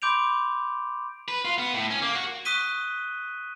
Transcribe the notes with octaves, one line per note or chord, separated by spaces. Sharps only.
B5 C6 D6 G6 D7 F7
B4
F4
B3
A2
C#4
A#3
F#4
C#6 D#6 F#6 B6 D#7 G7